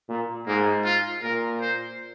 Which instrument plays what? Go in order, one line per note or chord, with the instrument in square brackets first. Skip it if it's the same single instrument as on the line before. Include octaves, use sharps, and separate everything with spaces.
[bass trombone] A#2
[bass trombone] G#2 [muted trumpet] A#3
[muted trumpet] F4
[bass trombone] A#2 [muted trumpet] A#4
[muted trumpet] C5